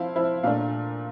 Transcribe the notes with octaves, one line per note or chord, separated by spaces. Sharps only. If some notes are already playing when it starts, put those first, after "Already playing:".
Already playing: F3 C4 E4 F5
F3 C4 E4
A#2 A3 D4 F5